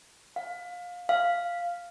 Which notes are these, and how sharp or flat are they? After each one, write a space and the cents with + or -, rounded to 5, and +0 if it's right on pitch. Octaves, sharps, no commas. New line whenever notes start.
F5 +20
F5 -5